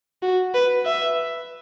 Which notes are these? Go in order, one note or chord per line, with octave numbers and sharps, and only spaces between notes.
F#4
B4
E5